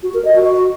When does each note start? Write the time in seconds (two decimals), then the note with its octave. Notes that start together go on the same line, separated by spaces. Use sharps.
0.03 F#4
0.14 A#4
0.25 D#5
0.36 F#4